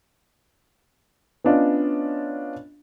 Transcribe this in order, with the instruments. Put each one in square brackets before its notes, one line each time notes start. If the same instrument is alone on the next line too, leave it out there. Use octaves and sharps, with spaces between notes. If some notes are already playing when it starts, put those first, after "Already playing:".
[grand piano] B3 C#4 D4 F4 D#5